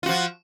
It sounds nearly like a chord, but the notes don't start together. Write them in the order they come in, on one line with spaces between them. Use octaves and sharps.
F4 F#4 F3